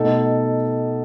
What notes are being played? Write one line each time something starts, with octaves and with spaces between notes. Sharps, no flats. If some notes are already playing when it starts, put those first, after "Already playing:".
Already playing: B2 A3 D#4 A4